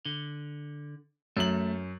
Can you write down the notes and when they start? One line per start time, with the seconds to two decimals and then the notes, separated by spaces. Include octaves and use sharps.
0.05 D3
1.37 F#2 A3 F#7